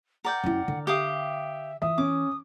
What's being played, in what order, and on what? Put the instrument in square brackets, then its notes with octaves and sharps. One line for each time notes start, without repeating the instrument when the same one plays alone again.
[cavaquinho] A#4 D5 G5 [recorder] F#5
[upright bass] F#2 E4
D3
[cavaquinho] G4 F5 D#6 [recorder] E5
[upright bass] E3 [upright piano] E5 [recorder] D#6
[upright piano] C#4 [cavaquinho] D6